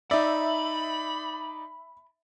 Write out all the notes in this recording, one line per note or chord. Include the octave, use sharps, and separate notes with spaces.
D#4 D5 E5 B5